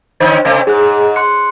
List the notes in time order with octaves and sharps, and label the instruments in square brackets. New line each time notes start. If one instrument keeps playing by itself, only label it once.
[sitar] D3 C4 C#4 [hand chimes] C5 A6
[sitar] C3 A3 C4
[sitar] G#2 [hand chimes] G#4 F#6
[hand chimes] C6 F#6 C#7